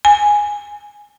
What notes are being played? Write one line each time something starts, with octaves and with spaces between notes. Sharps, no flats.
G#5